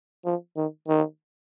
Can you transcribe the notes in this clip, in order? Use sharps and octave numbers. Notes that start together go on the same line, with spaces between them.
F3
D#3
D#3